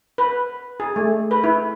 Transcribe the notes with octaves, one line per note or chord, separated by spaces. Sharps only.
B4
G#4
A3
B4
E4